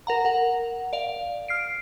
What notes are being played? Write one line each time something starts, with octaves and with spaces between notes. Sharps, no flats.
A#4 F#5 A#5
A#4 F#5
D5 F5
F6 C7 D7